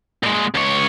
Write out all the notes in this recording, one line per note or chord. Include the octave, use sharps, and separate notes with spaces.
A#2 G#3
C#2 C#5